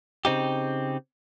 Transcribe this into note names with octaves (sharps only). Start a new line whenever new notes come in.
C#3 C4 D#4 G4